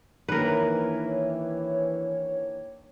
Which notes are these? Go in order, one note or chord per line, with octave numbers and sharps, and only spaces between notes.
D#3 E3 A#3 D4 A#4 B4 C#5